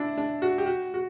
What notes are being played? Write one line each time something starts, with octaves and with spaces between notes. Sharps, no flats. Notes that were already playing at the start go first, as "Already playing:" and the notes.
Already playing: D4 E4
D4
F#4
G4
F#4
F#4